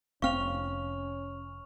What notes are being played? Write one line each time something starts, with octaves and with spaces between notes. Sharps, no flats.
F1 C4 C#4 F5 C#6 F6 F7